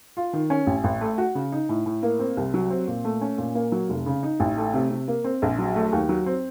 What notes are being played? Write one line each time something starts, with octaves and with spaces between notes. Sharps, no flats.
F4
D#3
C#4
A1
A1
A3
F#4
C#3
D#4
A2
A2
A#3
C4
C2
F#3
C4
A#2
A3
C#4
A#2
A#3
F#3
F1
C#3
D#4
A1
A3
C3
C3
A#3
C4
A#1
F#3
A3
D#2
F#3
C4